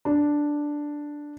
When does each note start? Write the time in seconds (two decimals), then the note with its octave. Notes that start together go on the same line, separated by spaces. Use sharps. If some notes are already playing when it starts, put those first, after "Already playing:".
0.05 D4